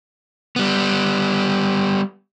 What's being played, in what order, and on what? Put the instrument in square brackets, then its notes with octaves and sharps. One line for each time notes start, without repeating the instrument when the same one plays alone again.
[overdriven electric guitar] G3 B3